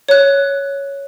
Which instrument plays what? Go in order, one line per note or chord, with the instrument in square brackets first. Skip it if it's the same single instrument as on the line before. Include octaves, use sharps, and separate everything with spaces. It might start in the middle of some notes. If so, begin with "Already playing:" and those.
[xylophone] C#5 F#6